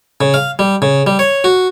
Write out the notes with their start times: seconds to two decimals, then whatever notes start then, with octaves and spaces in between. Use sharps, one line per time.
0.21 C#3
0.34 F5
0.59 G3
0.82 C#3
1.07 G3
1.19 C#5
1.44 F#4